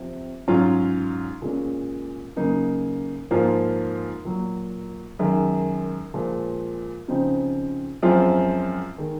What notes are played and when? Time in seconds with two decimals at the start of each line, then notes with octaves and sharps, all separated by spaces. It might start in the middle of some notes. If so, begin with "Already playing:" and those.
Already playing: C3 F3 C4
0.48 G#2 F#3 C#4 F4
1.42 A#2 G#3 C#4
2.36 C#3 F#3 A#3 D#4
3.31 G#2 F3 A#3 F4
4.25 A#2 F#3 A#3
5.19 F#2 D#3 G#3
6.14 A#2 F3 G#3
7.08 C#3 F3 C4 D#4
8.03 F#2 F3 G#3 C4 F4
8.98 D#3 G#3